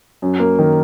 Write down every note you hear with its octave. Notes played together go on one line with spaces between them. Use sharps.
F#2
A#3
D#3